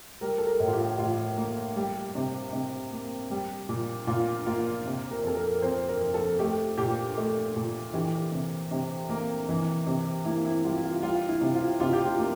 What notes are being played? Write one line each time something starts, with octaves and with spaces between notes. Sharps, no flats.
G3 A#4
A4
A#4
A2
F4
G4
A2 F4
A#3
G3
C3
C3
A#3
G3
A#2
A#2 F4
A#3 F4
C3
A#4
F2 A4
A#4
F2 C5
A#4
F3
A4
A3 G4
A#2 G4
A3
A#2
E3 G4
C3
C3
A#3
E3
C3
A#3 E4
E4
G3 F4
F4
G3 F4
E4
C3
F4
C3 F4
G4
F4
A#3